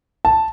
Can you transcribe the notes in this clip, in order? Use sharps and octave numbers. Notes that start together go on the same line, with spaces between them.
A5